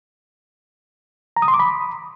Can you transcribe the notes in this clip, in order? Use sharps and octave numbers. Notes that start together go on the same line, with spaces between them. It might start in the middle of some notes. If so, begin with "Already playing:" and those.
A#5
D#6
C6
D6
B5